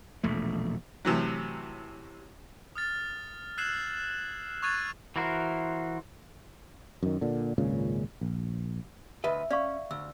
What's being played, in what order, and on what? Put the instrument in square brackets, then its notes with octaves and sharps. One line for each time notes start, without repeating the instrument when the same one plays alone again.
[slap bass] E1 A#1 A3
[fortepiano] A2 C3 E3 F#3
[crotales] D#6 F6 A6
E6 F#6 G#6 C7 E7 F#7
C#6 D#6 F#6 G#6 A6 D#7
[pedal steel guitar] E3 E4 F#4 A#4 C5
[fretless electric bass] F#2 D#3
A#2 D3
G#1 C#2 A#2 C#3
A#1
[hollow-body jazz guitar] D2 B4 D#5 [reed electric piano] E5
[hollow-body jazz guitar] C#4 [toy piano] D5 F5 C#6
[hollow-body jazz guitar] D2 [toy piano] E6